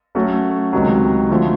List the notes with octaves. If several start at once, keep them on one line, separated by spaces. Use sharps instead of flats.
F#3 A3 C#4 F#4
C#2 C3 D#3 F#3
D3 F3 A3